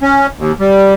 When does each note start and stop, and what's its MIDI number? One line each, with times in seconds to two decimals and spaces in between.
0.01 0.27 61
0.38 0.52 39
0.60 0.94 55